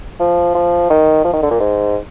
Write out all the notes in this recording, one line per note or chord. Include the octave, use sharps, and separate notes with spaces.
F3
F3
D#3
F3
D#3
D3
A#2
G#2